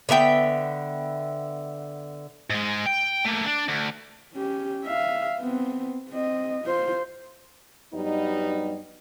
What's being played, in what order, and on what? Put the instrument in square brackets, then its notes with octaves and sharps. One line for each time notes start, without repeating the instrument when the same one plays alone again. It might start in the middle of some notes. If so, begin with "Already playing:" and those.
[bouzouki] D3 B3 E5 G5
[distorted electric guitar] G#2 G#3
G5
A3 A#3
D4
D2
[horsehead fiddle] C#4 G4
E5 F5
B3 C4
C4 D#5
F4 C5
[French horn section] G2 F#3 G3 B3 D#4